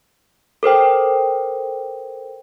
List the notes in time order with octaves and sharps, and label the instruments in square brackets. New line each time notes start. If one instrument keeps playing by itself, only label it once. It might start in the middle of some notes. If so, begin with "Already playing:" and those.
[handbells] A4 A#4 C5 G5